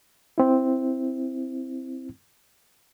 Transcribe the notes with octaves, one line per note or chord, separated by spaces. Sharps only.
C4 E4